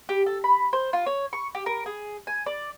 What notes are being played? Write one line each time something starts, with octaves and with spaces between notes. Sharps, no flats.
G4
A4
B5
C5
F4
C#5
C#6
G4
A#4
G#4
G#5
D5